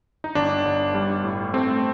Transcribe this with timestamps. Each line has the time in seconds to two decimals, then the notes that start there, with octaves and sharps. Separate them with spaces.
0.24 D#4
0.35 G1 D4
0.65 G1
0.94 G3
1.24 A2
1.53 A3 C4